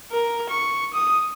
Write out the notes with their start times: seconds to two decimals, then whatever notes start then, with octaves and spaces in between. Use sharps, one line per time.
0.11 A#4
0.49 C#6
0.94 D#6